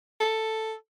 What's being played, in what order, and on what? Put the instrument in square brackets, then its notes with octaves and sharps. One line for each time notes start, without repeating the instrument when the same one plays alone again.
[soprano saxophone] A4